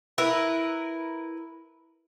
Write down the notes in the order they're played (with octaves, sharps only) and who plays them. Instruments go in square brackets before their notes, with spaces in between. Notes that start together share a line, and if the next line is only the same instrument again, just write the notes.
[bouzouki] E4 A#4 B4